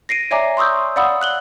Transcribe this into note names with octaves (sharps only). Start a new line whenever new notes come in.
A#6 C7 D7 D#7
C#5 D5 E5 G#5 A#5 D6
C6 C#6 D#6 E6 G6
D5 F5 F#5 B5 D#6 E6
F#6 F#7 G7